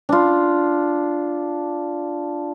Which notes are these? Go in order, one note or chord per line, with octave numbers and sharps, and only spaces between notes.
D4 F4